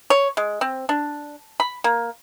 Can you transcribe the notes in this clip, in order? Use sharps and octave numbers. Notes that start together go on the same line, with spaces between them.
C#5
G#3
C4
D4
B5
A#3